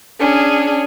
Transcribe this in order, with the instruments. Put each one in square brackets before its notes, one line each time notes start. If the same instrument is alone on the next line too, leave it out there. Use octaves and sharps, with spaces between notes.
[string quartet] C#4 D4 G#4